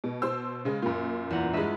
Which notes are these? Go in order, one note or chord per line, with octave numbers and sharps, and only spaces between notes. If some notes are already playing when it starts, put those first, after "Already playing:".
B2
B2 C5 E6
C#3 G#3
F#2 A#2 F4
E2 F#5 A#5
G2 G#3 B4 D#5 E5